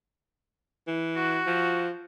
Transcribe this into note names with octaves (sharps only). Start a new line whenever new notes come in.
E3
F#4
F3